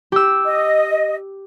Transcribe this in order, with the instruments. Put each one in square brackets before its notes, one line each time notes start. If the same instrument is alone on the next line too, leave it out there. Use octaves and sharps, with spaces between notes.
[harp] G4 E6
[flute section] D#5